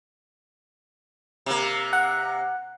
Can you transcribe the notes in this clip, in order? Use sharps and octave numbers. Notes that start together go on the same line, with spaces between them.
C3 A#3
F#5